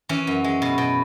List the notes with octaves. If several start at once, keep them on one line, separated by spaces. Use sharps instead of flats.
E3 C#4
F#2
G#3
B2
B2